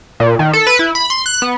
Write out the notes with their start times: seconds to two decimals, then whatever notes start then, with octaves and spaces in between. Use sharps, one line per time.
0.20 A#2
0.39 D#3
0.53 A4
0.67 B4
0.79 E4
0.95 B5
1.10 C6
1.26 F#6
1.42 B3